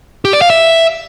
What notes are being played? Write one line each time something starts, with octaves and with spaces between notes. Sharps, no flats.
G4
D5
F5
E5